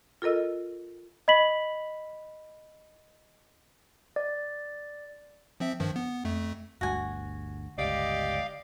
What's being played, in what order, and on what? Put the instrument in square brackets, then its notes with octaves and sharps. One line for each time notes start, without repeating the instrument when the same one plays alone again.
[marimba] F4 A4 A#4 D#5 E6
[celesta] D#5 B5 B6 F#7
[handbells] D5
[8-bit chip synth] F3 C4 E5
G2 D#3 F3
B3
F2 A3
[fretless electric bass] G1 D2 G2 [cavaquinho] F#4 G#5
[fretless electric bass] G1 C#2 [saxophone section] G4 D5 D#5 [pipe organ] F5